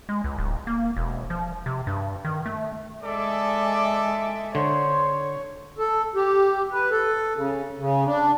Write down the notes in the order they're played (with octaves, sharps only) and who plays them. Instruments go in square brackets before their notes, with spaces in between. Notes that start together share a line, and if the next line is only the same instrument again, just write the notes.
[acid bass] G#3
C#2
D1
A#3
E1
F3
C3
G2
D#3
A3
[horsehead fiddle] G#3 E5 [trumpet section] A4 D6 [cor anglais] D5
[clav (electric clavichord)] D3 [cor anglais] C5 [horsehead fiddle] C#5
[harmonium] A4
G4
B4
A4
C#3
C#3
D4